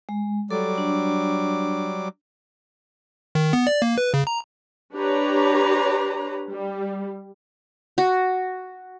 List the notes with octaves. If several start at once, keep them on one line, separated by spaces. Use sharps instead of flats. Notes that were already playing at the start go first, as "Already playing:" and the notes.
G#3
F#3 G3 A4 D6
D4
D#3
B3
D5
A#3
B4
C#3
A#5
D4 G4 B4 C#5 A#5
G3
F#4